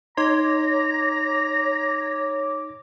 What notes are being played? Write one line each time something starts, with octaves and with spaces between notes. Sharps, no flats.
D#4 C#5 A#5 C6 D6